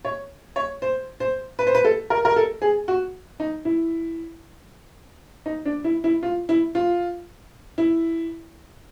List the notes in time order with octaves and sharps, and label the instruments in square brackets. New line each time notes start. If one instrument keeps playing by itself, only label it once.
[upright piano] C#5
C#5
C5
C5
B4
C5
B4
A4
A#4
A#4
A4
G#4
F#4
D#4
E4
D#4
D4
E4
E4
F4
E4
F4
E4